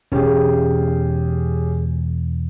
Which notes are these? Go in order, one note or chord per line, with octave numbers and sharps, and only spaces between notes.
E1 C#4 G4 G#4